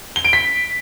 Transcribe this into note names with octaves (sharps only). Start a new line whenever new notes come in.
G7
D7
B6